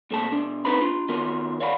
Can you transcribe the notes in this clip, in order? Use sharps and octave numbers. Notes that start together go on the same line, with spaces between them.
A#2 A3 C4 A5
B2 D4
C4 D#4 B4 C5 A#5 B5
D4 F4
D#3 B3 F4 A#4
C#5 D5 F5 F#5 A#5 B5